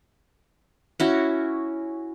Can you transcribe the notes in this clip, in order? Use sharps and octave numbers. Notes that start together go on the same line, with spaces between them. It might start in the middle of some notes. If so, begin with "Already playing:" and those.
C#4 E4 F#4